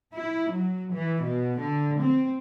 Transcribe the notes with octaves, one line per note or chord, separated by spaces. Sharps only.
E4
F#3
E3
B2
D3
C4